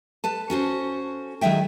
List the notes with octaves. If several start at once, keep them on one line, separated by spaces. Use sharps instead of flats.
A4 B4 A5
C#4 F#4 A4 C5
D#3 F#3 G#3 E5 G5